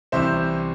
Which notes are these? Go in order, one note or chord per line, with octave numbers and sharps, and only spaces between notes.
C2 C3 E3 C5 E5